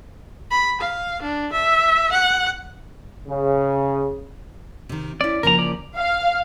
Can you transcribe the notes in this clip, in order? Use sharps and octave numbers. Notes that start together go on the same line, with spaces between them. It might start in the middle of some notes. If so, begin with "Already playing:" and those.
B5
F5
D4
E5
F#5
C#3
C3 D#3
C#4 E4 D5
C#3 F3 A#3 A#4 A#5
D5
F5